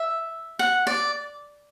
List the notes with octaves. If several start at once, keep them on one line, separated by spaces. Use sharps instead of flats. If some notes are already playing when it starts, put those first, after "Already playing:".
Already playing: E5
F#5
D5